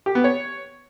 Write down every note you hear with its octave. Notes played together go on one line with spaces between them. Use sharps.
G4
B3
C#5